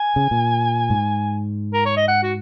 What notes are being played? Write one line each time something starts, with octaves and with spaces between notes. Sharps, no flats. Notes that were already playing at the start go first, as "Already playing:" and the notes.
Already playing: G#5
C#3
A#2
G#2
A#4
C#5
D#5
F#5
F#4